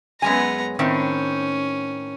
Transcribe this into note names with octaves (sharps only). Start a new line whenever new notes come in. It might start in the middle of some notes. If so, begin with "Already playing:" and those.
F#2 G#3 B3 G#5 A#5
A2 D#3 C4 C#4